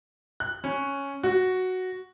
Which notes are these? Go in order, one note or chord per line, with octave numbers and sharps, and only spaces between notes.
F#6
C#4
F#4